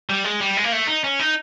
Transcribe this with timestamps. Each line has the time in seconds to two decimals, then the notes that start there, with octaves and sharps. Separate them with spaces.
0.10 G3
0.24 G#3
0.40 G3
0.57 G#3
0.64 A#3
0.72 A3
0.87 D#4
1.04 C#4
1.20 D#4